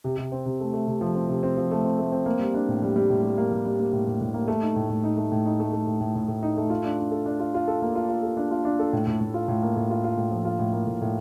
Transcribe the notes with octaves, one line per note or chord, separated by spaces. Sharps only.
C3
C3
C4
C3
A3
A3
C3
F3
C4
C3
C4
F3
A3
C4
A3
C4
A#3
G3
D4
A2
G3
G3
A2
G3
A#3
G3
G3
A#3
A2
A2
A2
A#3
A3
D#4
A2
A2
D#4
A3
A2
D#4
A3
A3
A2
A2
A2
A2
D#4
A3
F4
D4
D4
A4
D4
F4
F4
A4
A#3
F4
F4
A4
D4
F4
D4
A4
A2
A2
A2
F4
A2
A#3
A2
F4
F4
A2
F3
F4
A2
A#3
A2
A2